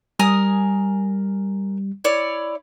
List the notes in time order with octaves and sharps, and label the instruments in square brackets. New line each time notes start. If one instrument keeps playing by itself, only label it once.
[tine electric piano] G3 [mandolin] A#4 G#5 D#6
[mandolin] E4 C#5 D5